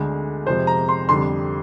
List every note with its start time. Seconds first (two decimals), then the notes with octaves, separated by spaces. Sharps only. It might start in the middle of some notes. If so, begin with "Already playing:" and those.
Already playing: D2 D3 G#3
0.46 F2 C3 F3 G#3 C5
0.67 A#5
0.89 C6
1.09 F2 D3 G3 C6